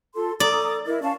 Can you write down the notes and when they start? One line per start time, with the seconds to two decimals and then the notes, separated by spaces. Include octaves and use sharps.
0.16 F4 A4 C6
0.40 A4 D5 A#5 D#6
0.86 E4 A#4 D#5
1.02 C#4 F5 A5 C#6